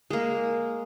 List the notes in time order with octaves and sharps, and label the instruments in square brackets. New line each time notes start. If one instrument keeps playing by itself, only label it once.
[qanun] G#3 A#3